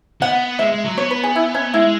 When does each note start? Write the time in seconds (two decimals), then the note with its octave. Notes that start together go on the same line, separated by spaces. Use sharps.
0.21 B3 F#5
0.59 G#3 E5
0.72 G#3
0.85 F#3
0.97 B3 C#5
1.11 B4
1.24 G#4
1.36 E4
1.55 C#4
1.74 G#3 E4